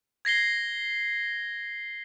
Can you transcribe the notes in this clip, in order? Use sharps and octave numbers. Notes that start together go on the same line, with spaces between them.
G#6 A#6 C7 G7